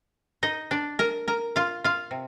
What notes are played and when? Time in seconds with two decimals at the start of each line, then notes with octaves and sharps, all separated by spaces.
0.43 D#4 D#5
0.71 D4 D5
0.99 A#4 A#5
1.28 A#4 A#5
1.56 F4 F5
1.84 F4 F5
2.11 C3